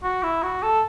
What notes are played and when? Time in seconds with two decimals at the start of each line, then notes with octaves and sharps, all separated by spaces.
0.03 F#4
0.23 E4
0.43 F#4
0.63 A4